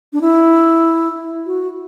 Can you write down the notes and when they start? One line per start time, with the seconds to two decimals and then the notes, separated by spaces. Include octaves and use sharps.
0.13 D4
0.21 E4
1.46 F#4